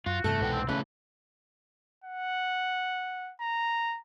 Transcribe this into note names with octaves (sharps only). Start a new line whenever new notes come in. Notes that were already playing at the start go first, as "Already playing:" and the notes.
F#2 F4 F#4
E2 G2 C3 A3 A4
C2 G#2 B2 B3 G5
C4
C#3 E3 A3 C#4 B4
F#5
A#5